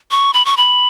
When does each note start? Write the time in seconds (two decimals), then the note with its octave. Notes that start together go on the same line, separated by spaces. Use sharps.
0.11 C#6
0.33 B5
0.45 C#6
0.57 B5